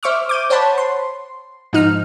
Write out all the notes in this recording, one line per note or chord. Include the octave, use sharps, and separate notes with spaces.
C5 E5 C#6 D6 F6
D6 G6 D#7
C5 C#5 F#5 A5 B5
C6
G#2 F3 D#4 F6